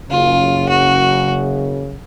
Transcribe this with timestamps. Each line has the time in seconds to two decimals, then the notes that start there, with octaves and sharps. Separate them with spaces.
0.10 F#1 F#2 C#3 F4
0.69 F#4